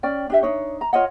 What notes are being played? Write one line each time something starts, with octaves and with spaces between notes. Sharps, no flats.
C#4 D5 G5
D4 G4 E5
D4 D#4 C#5
A#5
F4 C#5 D#5 F#5